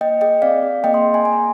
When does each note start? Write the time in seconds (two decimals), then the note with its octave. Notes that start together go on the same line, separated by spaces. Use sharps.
0.01 A#3 D#5 G5
0.21 G#4 D#5 G5
0.42 C4 D5 F5
0.62 G#4
0.84 A#3 D#5 G5
0.94 C6 D#6
1.05 G#4
1.14 G#5 C6
1.25 A#3 G#5
1.33 A#5